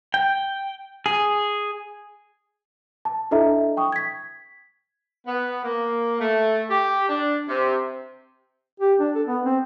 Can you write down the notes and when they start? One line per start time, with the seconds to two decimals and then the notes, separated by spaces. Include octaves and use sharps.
0.14 G5
1.06 G#4
3.05 A5
3.31 D4 E4 A4 D#5 E5 A#5
3.77 G5 C#6 D#6
3.92 G#6 B6
5.26 B3
5.63 A#3
6.20 A3
6.69 G4
7.08 D4
7.48 C3
8.80 G4
8.99 D4
9.15 A4
9.27 B3
9.44 C4